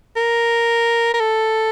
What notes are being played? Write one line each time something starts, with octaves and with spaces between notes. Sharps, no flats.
A#4
A#4
A4